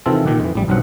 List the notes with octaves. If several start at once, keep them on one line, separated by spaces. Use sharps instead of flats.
C3 D#3 E3 C4 F4 A4
A#2 D#3 G4 F#5
F2 E3
A1 G3
B1 G2 F#3 C4 F#5